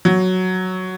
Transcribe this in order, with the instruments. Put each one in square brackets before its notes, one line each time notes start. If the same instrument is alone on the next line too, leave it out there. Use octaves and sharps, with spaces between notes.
[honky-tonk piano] F#3